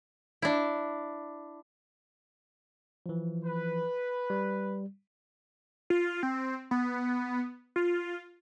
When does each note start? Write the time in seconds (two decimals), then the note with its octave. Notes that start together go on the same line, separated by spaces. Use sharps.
0.42 D4 E4
3.06 E3 F3
3.45 B4
4.30 G3
5.90 F4
6.23 C4
6.71 B3
7.76 F4